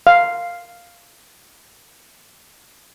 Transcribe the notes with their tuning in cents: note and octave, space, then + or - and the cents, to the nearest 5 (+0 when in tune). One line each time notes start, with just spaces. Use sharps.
F5 +0